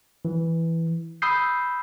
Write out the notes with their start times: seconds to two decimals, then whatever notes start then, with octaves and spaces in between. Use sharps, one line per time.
0.25 E3
1.22 B5 D#6 E6 G6 C7